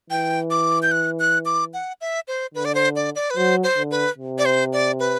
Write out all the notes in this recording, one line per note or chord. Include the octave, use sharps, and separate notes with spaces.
E3 G5
D6
G6
F#6
F#6
D6
F#5
E5
C5
D3 B4
D5
C5
D5
D5
B4
F#3 C5
C5
D3
B4
C3
D5
C5
D5
B4